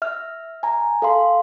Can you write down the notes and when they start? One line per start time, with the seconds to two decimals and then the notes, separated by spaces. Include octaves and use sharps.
0.02 E5 F6
0.63 G#5 A#5
1.02 A4 F5 C6